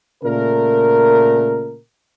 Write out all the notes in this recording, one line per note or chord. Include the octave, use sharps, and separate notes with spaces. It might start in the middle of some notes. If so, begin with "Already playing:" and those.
A#2 C#3 A3 A#4